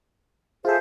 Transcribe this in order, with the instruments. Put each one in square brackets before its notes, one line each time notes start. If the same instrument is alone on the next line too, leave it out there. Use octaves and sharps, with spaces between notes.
[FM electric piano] F4 A4 [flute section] G#4 E5 [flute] C5